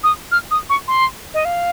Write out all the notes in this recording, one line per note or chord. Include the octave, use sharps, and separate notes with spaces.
D#6
F6
D#6
C#6
C6
D#5
F5